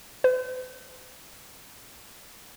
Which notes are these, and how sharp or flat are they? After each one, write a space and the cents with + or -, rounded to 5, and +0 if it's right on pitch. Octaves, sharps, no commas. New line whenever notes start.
C5 -45